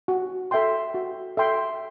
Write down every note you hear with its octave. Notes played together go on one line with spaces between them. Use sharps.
F#4
A4 E5 G5 C6
F#4
A4 E5 G5 C6